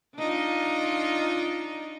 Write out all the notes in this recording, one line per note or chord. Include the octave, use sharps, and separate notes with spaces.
D4 D#4 F4